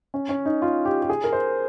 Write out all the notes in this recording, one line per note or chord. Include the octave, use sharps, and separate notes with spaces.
C#4
C#4
D#4
F4
G4
G4
G#4
A#4
C5